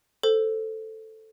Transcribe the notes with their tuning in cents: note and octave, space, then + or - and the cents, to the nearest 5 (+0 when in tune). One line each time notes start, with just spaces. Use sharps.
A4 +0 C5 +0